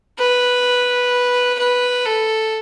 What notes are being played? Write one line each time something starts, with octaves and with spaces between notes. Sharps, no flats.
B4
B4
A4